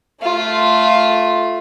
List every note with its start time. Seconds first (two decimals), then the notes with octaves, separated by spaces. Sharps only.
0.22 A3 F4